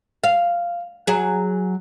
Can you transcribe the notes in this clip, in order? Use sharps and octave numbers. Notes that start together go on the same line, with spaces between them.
F5
F#3 G#4